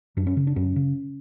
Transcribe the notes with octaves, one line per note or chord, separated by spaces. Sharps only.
F#2 D4
C#4
C#3
D4
F#2 C#4
C#3